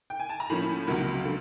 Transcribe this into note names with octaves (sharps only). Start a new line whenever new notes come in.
G5
G#5
A5
A#5
A2 F3 A#3 C#4 B5
C#2 C3 D#3 F#3 A#3
D3